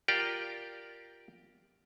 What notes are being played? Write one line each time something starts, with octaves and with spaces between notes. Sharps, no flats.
F4 G4 A#4 D5 G5